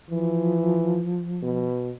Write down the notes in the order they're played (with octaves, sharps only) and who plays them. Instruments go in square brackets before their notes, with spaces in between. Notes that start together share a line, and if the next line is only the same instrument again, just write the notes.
[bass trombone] E3 [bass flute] F3
[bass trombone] B2